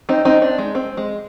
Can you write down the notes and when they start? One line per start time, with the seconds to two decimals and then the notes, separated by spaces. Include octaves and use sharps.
0.09 C4 D#4
0.25 C4 D#4
0.42 D4
0.58 G#3
0.75 C4
0.97 G#3